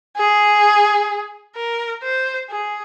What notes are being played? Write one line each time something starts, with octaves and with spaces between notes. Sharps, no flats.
G#4
A#4
C5
G#4